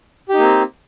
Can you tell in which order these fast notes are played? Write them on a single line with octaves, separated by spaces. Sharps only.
G4 D#4 A#3 C4